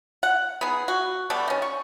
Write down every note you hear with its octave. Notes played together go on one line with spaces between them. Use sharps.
F#5
B3 D#4 G#4
F#4
G3 A3 B3 D4
D#3 C#4
C#6